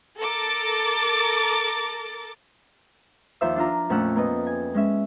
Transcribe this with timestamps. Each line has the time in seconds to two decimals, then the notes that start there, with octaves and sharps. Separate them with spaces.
0.18 A4 A#4 A#5 D6 A6
3.41 D#2 F3 C5 E5 E6
3.56 D4 F4 A#5
3.90 F2 A#2 A3 C#4 F#5 E6
4.16 A#3 B3 D#5
4.46 G#5
4.74 G#3 C#4 E5